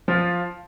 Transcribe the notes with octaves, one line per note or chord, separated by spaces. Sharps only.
F3 F4